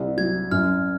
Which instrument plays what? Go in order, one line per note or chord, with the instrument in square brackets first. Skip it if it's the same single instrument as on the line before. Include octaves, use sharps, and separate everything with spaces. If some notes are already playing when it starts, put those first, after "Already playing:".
Already playing: [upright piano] C2
[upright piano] F#3 [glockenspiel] G#6
[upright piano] F#2 [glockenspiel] F6